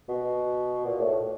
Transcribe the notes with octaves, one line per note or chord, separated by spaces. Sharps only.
B2
A#2
A2